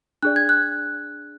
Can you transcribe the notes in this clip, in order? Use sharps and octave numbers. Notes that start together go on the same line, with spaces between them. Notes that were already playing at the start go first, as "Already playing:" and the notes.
D4 G#4 D5 F#6
G#6
F#6